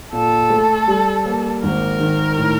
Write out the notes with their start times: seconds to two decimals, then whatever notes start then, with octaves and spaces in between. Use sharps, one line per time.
0.13 A#2 A4
0.50 A3
0.88 G3
1.26 A#3
1.63 G#1 A#4
2.00 D#3
2.38 A2